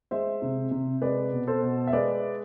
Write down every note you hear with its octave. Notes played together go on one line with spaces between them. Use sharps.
G#3 C5 E5
C3
C3
G#3 B4 D5
B2
A4 C5
B2
E5
G#3 B4 D5